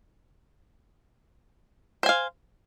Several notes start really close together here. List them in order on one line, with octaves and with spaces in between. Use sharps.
C5 G#5 F5